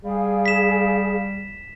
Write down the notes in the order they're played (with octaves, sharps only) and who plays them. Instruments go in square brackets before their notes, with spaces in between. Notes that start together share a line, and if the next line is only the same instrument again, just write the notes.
[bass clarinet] G3 [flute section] G#4 F5
[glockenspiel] B6 E7